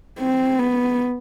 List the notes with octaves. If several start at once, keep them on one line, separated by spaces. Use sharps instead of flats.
C4
B3